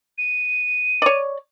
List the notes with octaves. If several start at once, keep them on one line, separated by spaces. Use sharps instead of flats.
D#7
C#5 D5